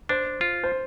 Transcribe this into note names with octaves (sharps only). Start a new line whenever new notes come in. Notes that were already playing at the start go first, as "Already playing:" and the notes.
D4 C5
F4
C5